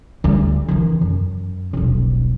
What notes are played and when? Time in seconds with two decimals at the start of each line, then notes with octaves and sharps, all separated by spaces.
0.24 D2 G3
0.68 D#3 E3
1.01 F#2
1.73 D#1 B1